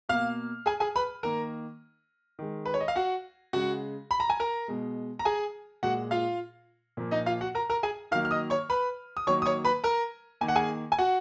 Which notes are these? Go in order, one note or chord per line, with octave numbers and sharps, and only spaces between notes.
B2 A#3 F5 F6
G#4 G#5
G#4 G#5
B4 B5
D#3 A#3 A#4 A#5
D#3 G#3
B4
C#5
D#5
F5
F#4 F#5
C#3 G#3 F#4 F#5
B5
A#5
G#5
A#4 A#5
B2 G#3
A#5
G#4 G#5
A#2 G#3 F#4 F#5
F4 F5
A#2 F3 A#3
D#4 D#5
F4 F5
F#4 F#5
A#4 A#5
A#4 A#5
G#4 G#5
D#3 F#3 A#3 F5 F6
F6
D#5 D#6
C#5 C#6
B4 B5
D#6
D#3 F#3 A#3 C#5 C#6
D#6
C#5 C#6
B4 B5
A#4 A#5
D#3 A#3 G#5
F#5
G#4 G#5
G#5
F#4 F#5